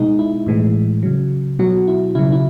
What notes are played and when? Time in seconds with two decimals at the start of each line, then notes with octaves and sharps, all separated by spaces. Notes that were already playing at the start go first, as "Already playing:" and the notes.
Already playing: B2 G#3 D#4
0.19 E4
0.47 A2 E3 G#3
1.03 C#3 F#3
1.59 B2 F#3 F#4
1.88 E4
2.15 C#3 F#3 E4
2.32 E4